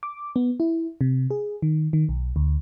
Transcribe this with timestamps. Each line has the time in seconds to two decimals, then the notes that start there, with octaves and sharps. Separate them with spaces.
0.03 D6
0.36 B3
0.60 E4
1.01 C3
1.31 G#4
1.62 D#3
1.93 D#3
2.09 B1
2.36 D2